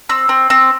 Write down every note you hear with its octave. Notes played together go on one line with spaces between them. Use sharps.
C4 E6
C4
C4